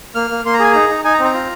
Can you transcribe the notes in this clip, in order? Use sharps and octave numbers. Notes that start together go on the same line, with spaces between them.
A#3 F6
A#3
A#3 C6
A#5
G#4 G#5
D#4 A#5
D#4
D#4 G#5
A#5
C4
A#5
F4